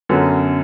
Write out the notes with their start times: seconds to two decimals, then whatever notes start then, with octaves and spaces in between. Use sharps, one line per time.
0.09 F#2 D3 F#3 B3